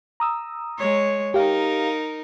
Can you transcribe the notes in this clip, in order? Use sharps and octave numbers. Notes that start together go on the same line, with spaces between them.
A#5 D#6 E6
G#3 C#5
D#4 G4 A#4 F5